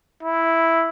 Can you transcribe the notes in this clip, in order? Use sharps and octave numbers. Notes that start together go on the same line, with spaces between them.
E4